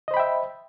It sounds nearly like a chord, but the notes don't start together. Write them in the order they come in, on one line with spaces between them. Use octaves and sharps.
D#5 C5 B5 G5 E5